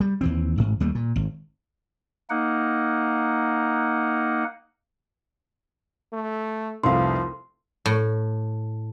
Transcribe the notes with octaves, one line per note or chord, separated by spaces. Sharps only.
G3
D#2 E3 C4
A1 G#2
D#2 G3 A3 A#3
A#2
G#1
A#3 D#4 F#5
A3
F1 C2 F3 F5 C6
A2